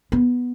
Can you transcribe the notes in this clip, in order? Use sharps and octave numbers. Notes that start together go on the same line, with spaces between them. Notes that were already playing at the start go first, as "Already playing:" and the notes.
B3